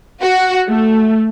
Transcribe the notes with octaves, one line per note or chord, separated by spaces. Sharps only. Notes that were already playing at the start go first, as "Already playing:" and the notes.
F#4
A3